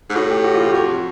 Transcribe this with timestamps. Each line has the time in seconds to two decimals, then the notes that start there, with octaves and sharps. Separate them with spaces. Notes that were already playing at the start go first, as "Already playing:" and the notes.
0.10 G#2
0.15 A2 F#4
0.30 G4
0.44 F#4
0.54 F4
0.63 G4
0.73 F2 F#4